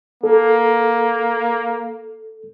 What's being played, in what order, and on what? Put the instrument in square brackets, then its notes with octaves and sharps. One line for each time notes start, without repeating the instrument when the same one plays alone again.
[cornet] A#3 [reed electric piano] A4